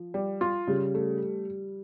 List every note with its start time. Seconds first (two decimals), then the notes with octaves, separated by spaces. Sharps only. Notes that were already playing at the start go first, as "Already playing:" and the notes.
Already playing: F3
0.14 G3
0.41 F4
0.67 C#3 G3
0.95 A3